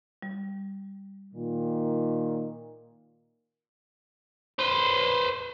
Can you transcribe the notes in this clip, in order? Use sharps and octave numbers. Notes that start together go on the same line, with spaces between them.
G3
A#2 D#3
B4 C5